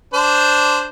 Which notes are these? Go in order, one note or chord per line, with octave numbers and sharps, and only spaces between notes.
D4 C5